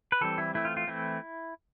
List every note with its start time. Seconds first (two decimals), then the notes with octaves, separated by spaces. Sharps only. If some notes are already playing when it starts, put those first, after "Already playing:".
0.12 B4
0.21 E3 G3 C4 A4
0.38 E4
0.54 E3 A3 C4 E4
0.65 F4
0.77 F4
0.87 E3 A3 C4 E4